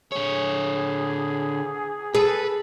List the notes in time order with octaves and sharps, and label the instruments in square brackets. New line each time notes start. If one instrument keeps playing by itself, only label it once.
[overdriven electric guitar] D3 C#5 [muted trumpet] G#4
[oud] G#4 [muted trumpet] A4 [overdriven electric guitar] B4